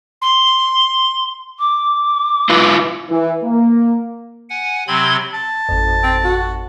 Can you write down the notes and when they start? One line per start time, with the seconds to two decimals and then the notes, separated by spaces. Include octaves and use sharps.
0.22 C6
1.59 D6
2.50 E4 F4 B4
3.10 E3
3.44 A#3
4.50 F#5 G#5
4.88 C3 F#3 C4 B5 C6 G#6
5.34 A5
5.69 G#1 F2
6.03 C4
6.24 F#4